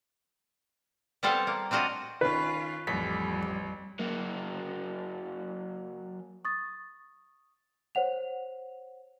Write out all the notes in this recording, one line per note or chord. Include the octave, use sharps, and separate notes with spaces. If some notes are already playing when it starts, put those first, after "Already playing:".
G3 B3 C4 F4 A4
A#3
C4 D4 F4 F#4 D#5
D#3 C#4 F4 B4
A1 F2 G3 B6
F#3 A#3
C#6 D#6 A6
C5 C#5 F#5 F7